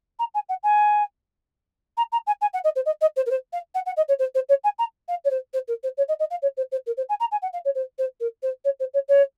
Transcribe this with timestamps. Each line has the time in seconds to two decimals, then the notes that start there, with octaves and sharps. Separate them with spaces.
0.19 A#5
0.34 G#5
0.49 F#5
0.63 G#5
1.97 A#5
2.12 A#5
2.26 G#5
2.41 G#5
2.53 F#5
2.64 D#5
2.75 C5
2.86 D#5
3.01 D#5
3.16 C5
3.26 A#4
3.30 C5
3.53 F5
3.74 F#5
3.86 F#5
3.97 D#5
4.08 C#5
4.19 C5
4.35 C5
4.49 C#5
4.64 G#5
4.78 A#5
5.08 F5
5.24 C#5
5.30 C5
5.53 C5
5.68 A#4
5.83 C5
5.97 C#5
6.08 D#5
6.19 D#5
6.30 F5
6.42 C#5
6.57 C5
6.72 C5
6.86 A#4
6.97 C5
7.09 G#5
7.20 A#5
7.31 G#5
7.42 F#5
7.53 F5
7.65 C#5
7.75 C5
7.98 C5
8.20 A#4
8.42 C5
8.64 C#5
8.79 C5
8.93 C#5
9.08 C#5